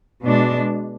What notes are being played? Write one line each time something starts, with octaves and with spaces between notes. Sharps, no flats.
B2 G#3 D4